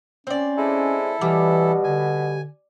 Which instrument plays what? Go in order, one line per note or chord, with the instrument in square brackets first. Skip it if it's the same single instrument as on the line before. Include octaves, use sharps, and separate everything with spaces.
[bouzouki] C4 D5 [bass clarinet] C#4
[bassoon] G#3 [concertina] E4 A4
[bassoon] B2 [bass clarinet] E3 [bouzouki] G3
[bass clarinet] D3 [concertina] G#5